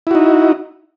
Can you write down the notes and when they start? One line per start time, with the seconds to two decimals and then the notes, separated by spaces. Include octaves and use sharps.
0.07 E4
0.11 F#4
0.15 D#4